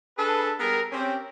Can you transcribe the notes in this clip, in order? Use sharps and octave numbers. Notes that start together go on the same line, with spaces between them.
D4 G#4 A4 B4
G3 B3 G#4 A#4
C4 C#4 G4